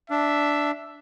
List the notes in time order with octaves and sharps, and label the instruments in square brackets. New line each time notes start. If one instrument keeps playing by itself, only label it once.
[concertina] D4 [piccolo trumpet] E5